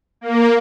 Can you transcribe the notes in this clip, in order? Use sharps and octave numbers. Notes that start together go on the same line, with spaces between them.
A#3